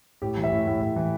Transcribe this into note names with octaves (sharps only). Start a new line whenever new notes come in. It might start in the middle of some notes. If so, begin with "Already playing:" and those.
A2 G4
E3
E5
A2
A2
A2
E3